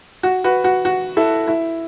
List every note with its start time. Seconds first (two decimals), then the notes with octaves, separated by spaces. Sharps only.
0.23 F#4
0.44 F#4 B4
0.64 F#4
0.85 F#4
1.17 E4 A4
1.48 E4